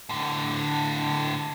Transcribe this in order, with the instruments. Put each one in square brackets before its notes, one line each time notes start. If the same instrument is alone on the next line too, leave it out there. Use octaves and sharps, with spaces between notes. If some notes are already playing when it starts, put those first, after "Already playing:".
[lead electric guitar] A2 D3